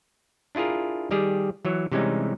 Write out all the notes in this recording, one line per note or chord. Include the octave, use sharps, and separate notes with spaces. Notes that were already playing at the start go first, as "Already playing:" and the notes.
D4 E4 F4 G#4 A#4
D#3 G3 G4 G#4
E3 F#3 C#5
C3 E3 G3 G#3 C#4 D#4